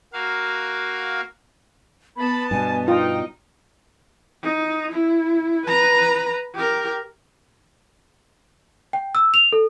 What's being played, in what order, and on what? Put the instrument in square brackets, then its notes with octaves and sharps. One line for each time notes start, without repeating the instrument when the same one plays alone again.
[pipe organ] A#3 F#4 F5
[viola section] B3 A5 [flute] B5
[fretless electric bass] G2 B2 [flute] G#5
[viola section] D#4 [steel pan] F4 [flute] G5
[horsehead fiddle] D#4
E4
B4 A#5
G4 A#4
[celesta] G5
E6
F7
A4